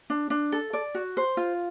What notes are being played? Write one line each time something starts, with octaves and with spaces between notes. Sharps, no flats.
D4
D4
A4
D5
F#4
C5
F4